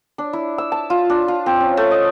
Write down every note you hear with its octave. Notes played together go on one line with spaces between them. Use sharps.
D4
E4
E6
A5
F4
D4
F4
C4
C#4
A3
D#5